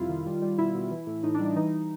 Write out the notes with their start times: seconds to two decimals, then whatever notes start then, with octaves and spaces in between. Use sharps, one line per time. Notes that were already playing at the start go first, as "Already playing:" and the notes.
Already playing: F2 C3 G3 E4 F4
0.09 D#3
0.26 G3
0.42 G3
0.58 B2 E4
0.75 B2
0.91 E3
1.07 A2
1.23 A2 D#4
1.35 D4
1.40 G3
1.46 D4
1.56 E3 D#4